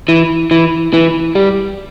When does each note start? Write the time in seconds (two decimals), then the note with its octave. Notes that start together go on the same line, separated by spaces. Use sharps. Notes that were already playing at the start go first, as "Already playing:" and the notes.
0.08 E3
0.51 E3
0.94 E3
1.35 G3